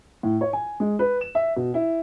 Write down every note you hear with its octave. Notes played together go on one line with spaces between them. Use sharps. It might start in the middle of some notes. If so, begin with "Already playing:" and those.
A2
C#5
G#5
G#3
B4
E7
E5
B2
E4